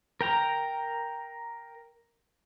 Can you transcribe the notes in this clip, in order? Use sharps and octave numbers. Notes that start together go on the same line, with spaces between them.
A#4 G5 A#5